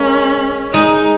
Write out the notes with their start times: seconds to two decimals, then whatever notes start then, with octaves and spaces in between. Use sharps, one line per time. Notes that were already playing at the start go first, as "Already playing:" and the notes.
Already playing: G#3 A#3 C#4
0.73 G#3 D#4